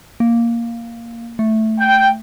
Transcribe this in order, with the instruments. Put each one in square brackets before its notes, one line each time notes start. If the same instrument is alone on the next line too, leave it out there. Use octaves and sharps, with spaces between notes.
[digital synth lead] A#3
A3
[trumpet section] G5